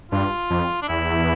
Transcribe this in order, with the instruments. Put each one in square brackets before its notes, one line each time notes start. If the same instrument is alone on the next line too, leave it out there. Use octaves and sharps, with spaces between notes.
[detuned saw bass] G2 [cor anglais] F4
[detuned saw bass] F2
[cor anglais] D4
[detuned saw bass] E2 [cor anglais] E4